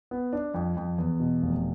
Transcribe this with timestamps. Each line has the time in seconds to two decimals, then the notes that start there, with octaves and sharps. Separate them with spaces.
0.11 B3
0.33 D4
0.54 F2
0.76 F2
0.98 E2
1.20 B2
1.42 F1